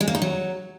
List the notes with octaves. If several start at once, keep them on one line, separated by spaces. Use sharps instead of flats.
G#3
A#3
D#4
F#3